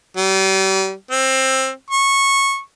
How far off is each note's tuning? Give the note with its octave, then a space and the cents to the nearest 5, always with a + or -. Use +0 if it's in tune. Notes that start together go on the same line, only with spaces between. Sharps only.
G3 -40
C4 +15
C#6 -15